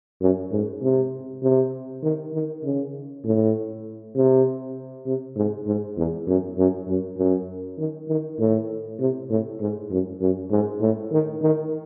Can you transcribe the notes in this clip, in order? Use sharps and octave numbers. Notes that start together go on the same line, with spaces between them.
F#2
G#2
C3
C3
D#3
D#3
C#3
A2
C3
C3
G#2
G#2
E2
F#2
F#2
F#2
F#2
D#3
D#3
A2
C3
A2
G#2
F#2
F#2
G#2
A2
D#3
D#3